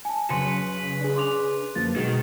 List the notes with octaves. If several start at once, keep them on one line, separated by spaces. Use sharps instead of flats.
G#5 A5
F2 C#3 F#3 B4 C6 C#7
D4 G#4
C6 D6 F7
F#2 D3 F3 A#3 A6
B2 D#3 G#3 F#4